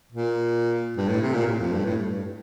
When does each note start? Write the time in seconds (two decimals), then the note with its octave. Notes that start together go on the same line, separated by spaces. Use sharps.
0.12 A#2
0.97 G2
1.08 A2
1.22 C3
1.34 A#2
1.47 A2
1.60 F2
1.72 G2
1.85 A2
1.98 G2
2.11 G2